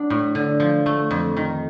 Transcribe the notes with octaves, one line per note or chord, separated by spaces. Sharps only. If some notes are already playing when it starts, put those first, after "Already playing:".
Already playing: F#3 B3 D4
A2
D3
F3
A3
F2
D#3